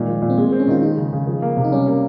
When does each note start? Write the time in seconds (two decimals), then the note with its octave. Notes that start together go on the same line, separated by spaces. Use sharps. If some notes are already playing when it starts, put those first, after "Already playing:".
Already playing: A#2 D#3 G#3
0.08 F3
0.22 A#2
0.30 C4
0.38 G#3 A#3
0.49 A#3
0.52 C4
0.60 C#4
0.68 D#3 F4
0.83 G#3 D#4
0.97 C#3
1.12 C#3
1.27 F3
1.42 A#3
1.57 C3
1.64 D#4
1.72 G3 C#4
1.87 A#3